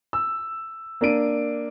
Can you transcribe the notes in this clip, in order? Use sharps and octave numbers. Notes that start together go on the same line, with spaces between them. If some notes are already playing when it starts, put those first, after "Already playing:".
E6
A#3 D4 D7 D#7